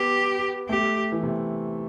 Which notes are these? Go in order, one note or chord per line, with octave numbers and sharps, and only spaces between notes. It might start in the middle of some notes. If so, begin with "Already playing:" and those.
Already playing: B3 G4
A3 G4
E3
C3